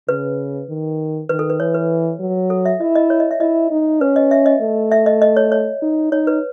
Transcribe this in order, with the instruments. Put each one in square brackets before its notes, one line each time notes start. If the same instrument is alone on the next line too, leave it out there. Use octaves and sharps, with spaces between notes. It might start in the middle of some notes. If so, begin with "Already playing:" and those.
[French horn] C#3 [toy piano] B4
[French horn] D#3
[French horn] D#3 [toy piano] B4
[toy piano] A4
B4
[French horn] E3 [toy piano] C#5
[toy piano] B4
[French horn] F#3
[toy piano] A4
E5
[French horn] E4 [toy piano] D#5
[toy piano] D#5
C#5
D#5
E5
[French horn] E4 [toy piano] D#5
[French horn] D#4
[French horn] C#4 [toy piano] B4
[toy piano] D#5
E5
D#5
[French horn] A3
[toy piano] E5
D#5
D#5
C#5
C#5
[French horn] D#4
[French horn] D#4 [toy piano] C#5
[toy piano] B4